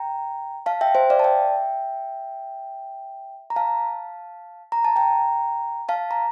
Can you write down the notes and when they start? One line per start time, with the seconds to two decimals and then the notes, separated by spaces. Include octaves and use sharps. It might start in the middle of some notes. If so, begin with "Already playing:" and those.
Already playing: G5 A#5
0.66 F5 A5
0.81 E5 G5
0.95 C5 E5
1.10 D5 F5
1.19 A5
1.24 E5 G5
3.50 A#5
3.56 F5 A5
4.72 A#5
4.85 A5
4.96 G5 A#5
5.89 F5 A5
6.11 A#5